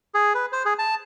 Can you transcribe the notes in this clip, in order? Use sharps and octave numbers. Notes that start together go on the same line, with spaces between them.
G#4
B4
C5
G#4
A5